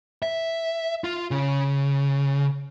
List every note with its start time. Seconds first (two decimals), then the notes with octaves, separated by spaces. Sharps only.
0.22 E5
1.04 F4
1.31 C#3